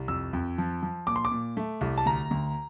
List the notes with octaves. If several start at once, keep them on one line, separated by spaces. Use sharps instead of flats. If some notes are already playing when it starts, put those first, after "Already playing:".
Already playing: C2
F2 E6
F2
F3
F3
A#2 D6
C6
D6
A#2
A3
C2
A5
D2 A#5
D2